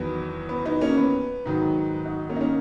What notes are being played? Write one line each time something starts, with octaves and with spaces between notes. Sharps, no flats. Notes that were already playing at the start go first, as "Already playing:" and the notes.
Already playing: E2 D#3 F#3 B3
B3
B3 D#4
A#3 C#4
B3
G#2 D#3 F#3
D#4 F#4
A#3 C#4
D#4
A#3 C#4